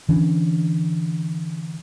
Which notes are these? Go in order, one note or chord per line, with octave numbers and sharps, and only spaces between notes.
D3 E3 C#4 D4